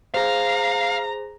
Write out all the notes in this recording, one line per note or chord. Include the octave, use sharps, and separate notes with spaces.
G#4 C5 F5 A#5